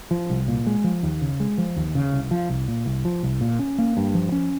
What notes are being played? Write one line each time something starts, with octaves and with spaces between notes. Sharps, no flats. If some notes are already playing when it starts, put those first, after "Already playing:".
F3
C2
A#2
G#3
F3
D#2
C#3
G#3
F3
D#2
C#3
C2
F3
C2
A#2
C2
F3
C2
A#2
C#4
A#3
G2
F3
C#4